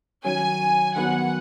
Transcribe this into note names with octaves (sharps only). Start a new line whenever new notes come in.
D#3 F#3 C#4 G#5
D#3 F#3 B3 F#5